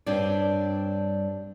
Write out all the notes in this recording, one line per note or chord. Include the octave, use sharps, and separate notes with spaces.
G2 G3 C4 D4 C#5 D5